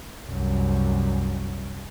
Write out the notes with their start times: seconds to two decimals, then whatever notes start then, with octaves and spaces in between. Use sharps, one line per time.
0.25 C2 F#2